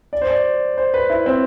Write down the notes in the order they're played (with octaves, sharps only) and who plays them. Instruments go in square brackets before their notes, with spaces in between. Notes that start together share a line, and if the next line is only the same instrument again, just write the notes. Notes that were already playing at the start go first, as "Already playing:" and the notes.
[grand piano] D5
C5
D5
C5
B4
E4
C4